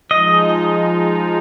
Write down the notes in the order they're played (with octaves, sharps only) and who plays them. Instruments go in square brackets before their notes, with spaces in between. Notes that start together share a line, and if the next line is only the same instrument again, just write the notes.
[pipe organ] F3 G#3 D#4 [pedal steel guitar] D#5